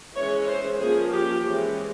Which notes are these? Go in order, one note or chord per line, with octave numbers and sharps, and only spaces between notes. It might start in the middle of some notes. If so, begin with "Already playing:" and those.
E3 G#3 C#4 C#5
C5
F3 A#3 C#4 G#4
G4
E3 G#3 C#4